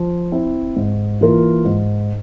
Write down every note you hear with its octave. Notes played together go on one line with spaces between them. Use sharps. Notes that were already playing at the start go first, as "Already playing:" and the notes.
Already playing: F3
C4 E4
G#2
E3 A#3 F4 A#4
G#2